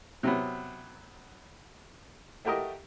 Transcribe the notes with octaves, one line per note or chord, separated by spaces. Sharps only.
C3 F#3 B3
A3 F#4 G4 A#4 D#5